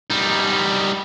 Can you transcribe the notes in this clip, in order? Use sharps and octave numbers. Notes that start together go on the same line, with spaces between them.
G3 D#4